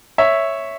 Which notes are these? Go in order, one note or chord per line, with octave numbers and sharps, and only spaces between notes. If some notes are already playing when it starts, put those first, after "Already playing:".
C#5 E5